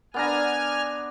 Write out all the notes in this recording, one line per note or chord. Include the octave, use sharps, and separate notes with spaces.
B3 D4 G#5 A#5 F6